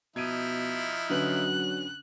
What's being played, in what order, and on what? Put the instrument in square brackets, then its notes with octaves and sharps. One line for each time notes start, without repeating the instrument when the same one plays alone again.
[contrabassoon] B2 [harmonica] F3 D#4 E4 [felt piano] G#6 D7 D#7
[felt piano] D3 C#4 B4 [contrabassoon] F#3 [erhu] F#6